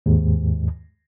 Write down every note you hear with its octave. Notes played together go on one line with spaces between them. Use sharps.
D#2 G#2